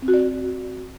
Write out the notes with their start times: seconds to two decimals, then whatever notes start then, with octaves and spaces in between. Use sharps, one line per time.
0.02 C4
0.08 F#4
0.14 D5